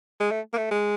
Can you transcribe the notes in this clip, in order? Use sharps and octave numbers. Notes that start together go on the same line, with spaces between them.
G#3
A3
A#3
A3
G#3